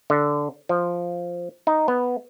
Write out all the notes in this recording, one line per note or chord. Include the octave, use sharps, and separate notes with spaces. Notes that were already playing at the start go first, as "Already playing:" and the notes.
D3
F3
D#4
B3